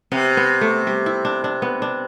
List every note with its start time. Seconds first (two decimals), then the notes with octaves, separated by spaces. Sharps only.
0.12 C3 B3
0.37 B3
0.61 A3
0.87 G3
1.06 E4
1.25 D4
1.44 D4
1.62 B3
1.82 D4